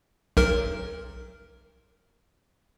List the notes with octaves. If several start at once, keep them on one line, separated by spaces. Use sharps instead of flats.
B1 A#4